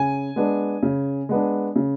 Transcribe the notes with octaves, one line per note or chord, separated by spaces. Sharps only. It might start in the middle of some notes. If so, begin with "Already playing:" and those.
Already playing: C#3 G#5
G#3 B3 D4
C#3
G#3 B3 D4
C#3